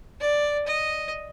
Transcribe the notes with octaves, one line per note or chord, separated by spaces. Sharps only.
D5
D#5